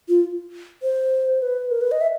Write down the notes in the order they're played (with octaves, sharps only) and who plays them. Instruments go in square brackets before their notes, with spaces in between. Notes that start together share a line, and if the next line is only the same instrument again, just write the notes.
[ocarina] F4
C5
B4
A#4
B4
D#5
E5